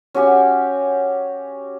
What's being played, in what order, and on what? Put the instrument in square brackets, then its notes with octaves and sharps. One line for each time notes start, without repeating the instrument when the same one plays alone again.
[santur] C#4 F#4 G4 G#5